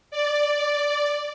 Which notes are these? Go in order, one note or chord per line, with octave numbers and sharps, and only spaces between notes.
D5